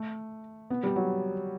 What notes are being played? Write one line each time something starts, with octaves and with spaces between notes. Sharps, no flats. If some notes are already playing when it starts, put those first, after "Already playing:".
Already playing: A3
B3
G3
F#3